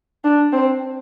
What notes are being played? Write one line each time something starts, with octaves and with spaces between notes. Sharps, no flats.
D4
C4